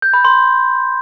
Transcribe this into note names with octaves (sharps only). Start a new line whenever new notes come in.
G6
B5
C6